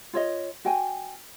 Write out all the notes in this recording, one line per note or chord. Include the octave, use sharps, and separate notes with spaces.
F4 C#5 D#5
F#4 G5 G#5